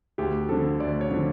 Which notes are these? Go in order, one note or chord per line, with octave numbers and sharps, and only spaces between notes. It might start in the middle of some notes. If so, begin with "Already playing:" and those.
D2 G4
D3 F3 A4
D2 D5
C#5
D3 F3